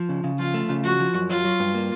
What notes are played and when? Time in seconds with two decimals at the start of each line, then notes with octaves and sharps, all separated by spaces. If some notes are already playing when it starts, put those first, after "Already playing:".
Already playing: F3
0.09 C#3
0.24 C#3
0.39 F3 F4
0.54 A3
0.69 C#3
0.84 F3 F#4
1.00 F3
1.14 F#2
1.30 F#3 F4
1.45 F#3
1.60 G2
1.75 A#3